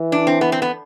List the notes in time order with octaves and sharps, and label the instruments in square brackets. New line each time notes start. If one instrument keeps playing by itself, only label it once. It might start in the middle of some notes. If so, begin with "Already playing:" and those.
Already playing: [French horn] E3
[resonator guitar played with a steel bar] D4
C4
B3
C4
B3